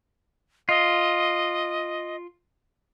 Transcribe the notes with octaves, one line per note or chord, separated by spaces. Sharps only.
F4 D#5